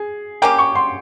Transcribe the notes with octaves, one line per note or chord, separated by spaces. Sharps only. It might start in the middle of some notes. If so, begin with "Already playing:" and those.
Already playing: G#4
A#3 C#4 G4 G5
C#6
C6